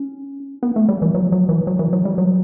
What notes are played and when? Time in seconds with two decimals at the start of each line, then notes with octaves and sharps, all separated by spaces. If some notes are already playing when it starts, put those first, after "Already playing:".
Already playing: C#4
0.63 B3
0.76 A3
0.89 G3
1.02 E3
1.14 F#3
1.32 F#3
1.49 E3
1.67 F#3
1.79 E3
1.93 F#3
2.05 G3
2.18 F#3